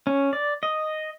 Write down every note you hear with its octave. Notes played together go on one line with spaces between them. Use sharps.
C#4
D5
D#5